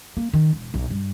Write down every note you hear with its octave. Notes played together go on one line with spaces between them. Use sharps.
A#3
D#3
E1
B1
G2